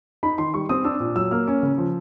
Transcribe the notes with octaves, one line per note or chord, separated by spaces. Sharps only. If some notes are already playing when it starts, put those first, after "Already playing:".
D#4 B5
D#3 C6
G3 C#6
C4 D#6
D4 E6
A#2
F#3 E6
A#3 F6
C#4
C#3
F3